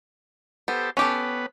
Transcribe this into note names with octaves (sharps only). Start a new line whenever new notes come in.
B3 G4 A4 C5
B3 C#4 G4 A4 B4